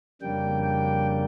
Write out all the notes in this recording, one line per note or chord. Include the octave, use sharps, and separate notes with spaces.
F2 C#3 G3 A#3 D4 G5
G5